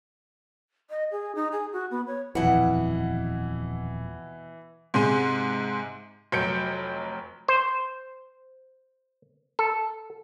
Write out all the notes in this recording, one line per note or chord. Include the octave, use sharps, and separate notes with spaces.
D#5
G#4
D#4
G#4
F#4
B3
C#5
D#1 F2 B2 E3 E4 F#5
G#2 C3 G#3 C6 D#7
F1 F#3 G6 C#7 D7
C5
A4